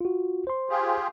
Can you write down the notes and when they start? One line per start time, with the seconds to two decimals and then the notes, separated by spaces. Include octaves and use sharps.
0.01 F4 F#4
0.47 C5 C6
0.70 F4 G4 G#4